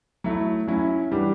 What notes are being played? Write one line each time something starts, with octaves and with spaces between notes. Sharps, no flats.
F#3 A3 E4
F#3 C#4 E4
E3 G3 D4 F#4